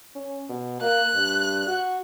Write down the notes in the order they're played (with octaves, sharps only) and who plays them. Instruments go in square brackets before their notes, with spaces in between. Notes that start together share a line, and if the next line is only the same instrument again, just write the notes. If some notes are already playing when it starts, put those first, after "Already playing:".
[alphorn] C#4
B2
[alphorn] A#3 [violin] F#6
[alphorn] G2
F#4